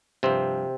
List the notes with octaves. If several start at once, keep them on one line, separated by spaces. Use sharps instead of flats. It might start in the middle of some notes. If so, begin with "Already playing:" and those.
G2 C3 F3 C4